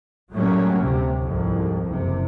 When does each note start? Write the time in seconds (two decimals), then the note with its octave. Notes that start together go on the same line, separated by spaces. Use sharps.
0.33 A2 F#3 G3 A3 A#3 C#4
0.83 D2 C3
1.20 C2 F2 G#2
1.87 F#1 C3